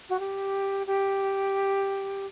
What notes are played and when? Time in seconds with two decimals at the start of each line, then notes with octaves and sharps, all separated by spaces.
0.09 F#4
0.19 G4
0.87 G4